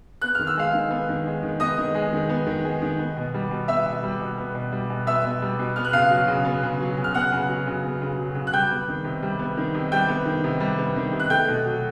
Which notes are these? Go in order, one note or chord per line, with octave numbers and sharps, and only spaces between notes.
B3 F#6
D#3 F6
E6
G#3 F5 F6
D#3
B3
D#3
G#3
D#3
B3 D#5 D#6
D#3
G#3
D#3
B3
D#3
G#3
D#3
B3
B2
G3
B2
B3 E5 E6
B2
G3
B2
B3
B2
G3
B2
B3 E5 E6
B2
G3
B2
B3 F6
F#6
C#3 F5 F6
F#3
C#3
B3
C#3
F#3
C#3
F6
B3 F#5 F#6
C#3
F#3
C#3
B3
C#3
F#3
C#3
F#6
G3 G5 G6
B3
D#3
C3
G3
B3
D#3
C3
G3 G5 G6
B3
D#3
C3
G3
B3
D#3
C3
F#6
A3 G5 G6
B2
F#3